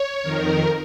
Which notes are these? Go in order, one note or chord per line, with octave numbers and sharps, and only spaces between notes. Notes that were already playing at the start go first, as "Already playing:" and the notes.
Already playing: C#5
F2 D#3 A#4